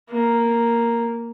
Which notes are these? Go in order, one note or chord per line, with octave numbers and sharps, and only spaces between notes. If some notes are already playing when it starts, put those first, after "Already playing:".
A#3